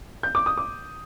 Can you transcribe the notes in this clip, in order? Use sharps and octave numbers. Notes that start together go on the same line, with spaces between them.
G6
D6
D#6
D6